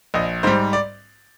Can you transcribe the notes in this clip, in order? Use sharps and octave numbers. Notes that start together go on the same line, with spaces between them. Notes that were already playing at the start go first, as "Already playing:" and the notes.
A#1 D#5
G#2 G3 C5
D5